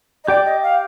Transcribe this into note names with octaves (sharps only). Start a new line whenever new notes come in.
D#5
G4 D5 G5
D#5
F5